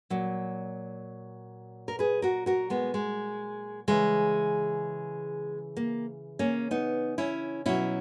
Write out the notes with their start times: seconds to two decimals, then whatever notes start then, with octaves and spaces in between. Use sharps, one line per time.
0.10 A#2 F#3
1.88 A#4
1.99 G#4 B4
2.22 F#4 A#4
2.46 F#4 A#4
2.70 G#3 B3
2.94 G#3
3.88 C#3 E3 G#3
5.77 A#3
6.39 A#3 C#4
6.71 B3 D#4
7.18 C#4 E4
7.66 B2 F#3 C#4 E4